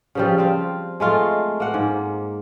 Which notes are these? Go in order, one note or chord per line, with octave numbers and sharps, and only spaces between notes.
C#3 F3 G3
C4 F4
G#3 A3 F4
A#3 F#5
G#2